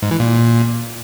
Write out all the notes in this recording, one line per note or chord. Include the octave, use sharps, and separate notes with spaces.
G#2
E3
A#2